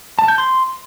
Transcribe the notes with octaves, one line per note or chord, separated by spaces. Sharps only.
A5
G6
C6